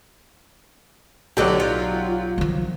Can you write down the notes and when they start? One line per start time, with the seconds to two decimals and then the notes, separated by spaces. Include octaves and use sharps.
1.37 B1 A2 D3 F#3 F#4 G4 D#5
1.60 F4
2.38 D#3 F3